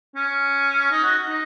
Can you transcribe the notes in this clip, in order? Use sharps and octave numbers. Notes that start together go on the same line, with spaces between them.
C#4
D#4
F#4
D#4